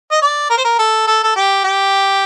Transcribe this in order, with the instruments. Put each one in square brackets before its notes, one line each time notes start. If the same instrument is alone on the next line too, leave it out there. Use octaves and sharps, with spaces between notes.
[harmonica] D#5
D5
A#4
C5
A#4
A4
A4
A4
G4
G4